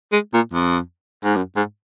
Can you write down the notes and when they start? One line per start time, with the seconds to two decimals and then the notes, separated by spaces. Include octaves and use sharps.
0.12 G#3
0.34 A#2
0.53 F2
1.24 G#2
1.36 F#2
1.56 G#2